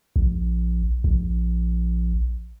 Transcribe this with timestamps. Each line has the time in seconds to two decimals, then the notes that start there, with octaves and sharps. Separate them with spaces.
0.16 A#1
1.04 A#1